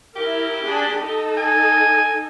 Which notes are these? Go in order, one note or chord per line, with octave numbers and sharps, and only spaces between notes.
E4 G4 A#4
D4 G#4 B5
D#4 A4
G#5